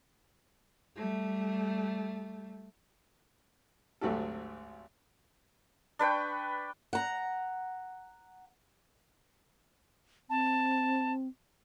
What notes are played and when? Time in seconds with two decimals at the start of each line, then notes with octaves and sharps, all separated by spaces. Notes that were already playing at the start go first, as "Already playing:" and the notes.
0.96 G3 A3
4.01 G#1 D2 F#3 G4 A4
5.99 D4 B4 G5 C#6
6.93 F#5 A#5
10.30 C4 A5